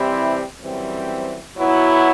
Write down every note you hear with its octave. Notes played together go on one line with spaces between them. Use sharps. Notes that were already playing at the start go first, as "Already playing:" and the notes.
Already playing: C3 E3 G3 C4 E4
F#2 E3 G3 C4
B2 F#3 B3 E4